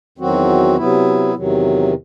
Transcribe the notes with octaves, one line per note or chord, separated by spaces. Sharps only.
E2 D#3 F#3 C4 F#4
C3 F#3 B3 E4
E2 C3 D#3 F#3